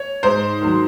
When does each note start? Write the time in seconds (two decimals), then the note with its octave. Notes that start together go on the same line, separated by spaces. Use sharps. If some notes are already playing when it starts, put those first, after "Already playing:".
Already playing: C#5
0.23 G#2 C5
0.61 D#3 F#3